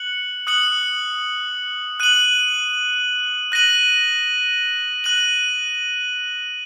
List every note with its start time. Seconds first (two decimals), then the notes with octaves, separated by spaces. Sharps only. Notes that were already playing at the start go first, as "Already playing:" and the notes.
Already playing: F#6 C#7 F#7
0.47 D#6 F#6 C#7 F#7
2.00 F#6 D#7 F#7
3.52 F#6 A#6 D#7 F#7
5.04 F#6 D#7 F#7